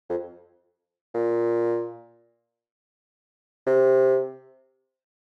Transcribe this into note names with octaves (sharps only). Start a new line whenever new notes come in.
F2
A#2
C3